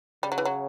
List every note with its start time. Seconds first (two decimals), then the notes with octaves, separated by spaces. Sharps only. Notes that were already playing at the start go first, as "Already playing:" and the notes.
0.23 C#3 G3
0.32 F#3
0.38 E3
0.45 F#3